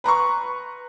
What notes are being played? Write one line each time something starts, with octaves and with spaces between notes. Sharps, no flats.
B4 A#5 C6 C#6